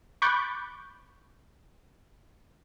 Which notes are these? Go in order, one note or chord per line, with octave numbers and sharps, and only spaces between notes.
B5 C#6 D6 F#6 G6 A6